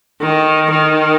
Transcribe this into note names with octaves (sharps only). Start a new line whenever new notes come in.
D#3
D#3